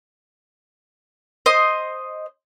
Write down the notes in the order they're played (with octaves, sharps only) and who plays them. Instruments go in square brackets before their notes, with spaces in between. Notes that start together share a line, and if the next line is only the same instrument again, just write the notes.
[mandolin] C5 D#5